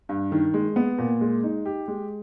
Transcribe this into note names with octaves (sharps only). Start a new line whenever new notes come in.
G2
D#3
G#3
B3
A#2
G#3
D#4
G4
G#3